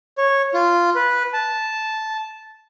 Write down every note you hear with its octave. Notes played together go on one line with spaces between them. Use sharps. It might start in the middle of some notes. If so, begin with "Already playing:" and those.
C#5
F4
B4
A5